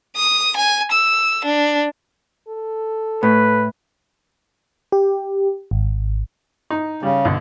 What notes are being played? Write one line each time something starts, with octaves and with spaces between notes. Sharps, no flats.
D#6
G#5
E6
D4
A4
A2 B4
G4
G#1
D#4
C#3 G3
B1 D3